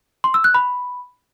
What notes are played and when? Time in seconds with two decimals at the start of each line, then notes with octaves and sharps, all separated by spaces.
0.24 C6
0.34 E6
0.44 F#6
0.54 B5